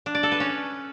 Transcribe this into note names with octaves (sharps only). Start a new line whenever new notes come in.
D4
D5
A4
B4
C#4